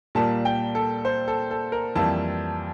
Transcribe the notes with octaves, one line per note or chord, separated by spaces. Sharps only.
A#2 G3 A#3 A5
G5
A4
C5
A4
A4
A#4
F2 E3 G3 A#3 A5